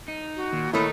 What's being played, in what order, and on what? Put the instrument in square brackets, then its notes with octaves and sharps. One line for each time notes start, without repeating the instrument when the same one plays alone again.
[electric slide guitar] D#4
[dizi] F#4
[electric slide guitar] A#2 [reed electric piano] D#3
[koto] D#3 A3 D#4 [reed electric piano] E4 C#5 F#6 [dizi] B5